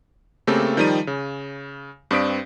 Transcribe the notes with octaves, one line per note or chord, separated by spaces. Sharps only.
C#3 A3 A#3 C4 G4 A4
D#3 F3 G3 D#4 D#7
C#3
G2 C4 D5 D#6 B6 D7